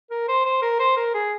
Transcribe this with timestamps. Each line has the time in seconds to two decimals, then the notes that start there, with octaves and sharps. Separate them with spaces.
0.11 A#4
0.29 C5
0.46 C5
0.62 A#4
0.79 C5
0.97 A#4
1.14 G#4